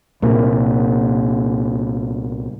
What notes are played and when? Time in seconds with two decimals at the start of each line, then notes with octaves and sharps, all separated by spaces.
0.22 C2 A#2 A#3